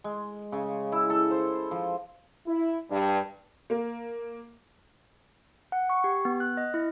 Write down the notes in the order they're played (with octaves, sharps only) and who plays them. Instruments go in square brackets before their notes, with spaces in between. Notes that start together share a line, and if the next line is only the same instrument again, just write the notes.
[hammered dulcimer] G#3
C#3
E4
A4
C5
F3
[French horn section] E4
G2
[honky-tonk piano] A#3
[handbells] F#5
C#6
G4
B3
F#6
D#5
E4